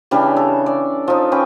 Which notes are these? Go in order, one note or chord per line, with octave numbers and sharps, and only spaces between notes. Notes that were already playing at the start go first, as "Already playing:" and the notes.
C#3 E3 G3 D4
A4
D5
F3 D#4
C#4 B4 G5